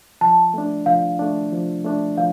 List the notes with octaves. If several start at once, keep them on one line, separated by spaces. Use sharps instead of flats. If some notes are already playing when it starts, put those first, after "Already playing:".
F3 A5
A3 D4
F3 F5
A3 D4
F3
A3 D4
F3 F5